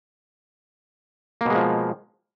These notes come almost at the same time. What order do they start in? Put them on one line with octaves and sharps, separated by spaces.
A#3 B2 G#3 F3